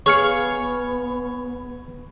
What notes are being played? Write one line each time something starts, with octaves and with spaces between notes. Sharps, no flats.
B3 G#4 C#5 F5 C#6 F6 C#7